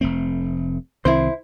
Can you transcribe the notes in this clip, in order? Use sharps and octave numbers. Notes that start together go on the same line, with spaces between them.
F1 A3 C4
C2 D#3 C4 E4 C5